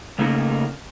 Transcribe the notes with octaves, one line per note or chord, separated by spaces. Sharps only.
C#3 A3 A#3 C#4 D#4 A#4